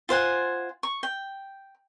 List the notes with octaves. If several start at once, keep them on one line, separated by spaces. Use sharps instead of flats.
F4 C5 F#5 G#5
C#6
G5